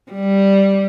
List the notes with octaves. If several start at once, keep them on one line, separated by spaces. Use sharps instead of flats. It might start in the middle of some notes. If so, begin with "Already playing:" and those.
G3